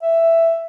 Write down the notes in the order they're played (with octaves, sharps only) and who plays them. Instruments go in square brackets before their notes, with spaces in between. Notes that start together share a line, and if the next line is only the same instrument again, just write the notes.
[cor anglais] E5